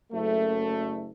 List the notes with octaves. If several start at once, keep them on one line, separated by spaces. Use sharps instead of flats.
F#1 A3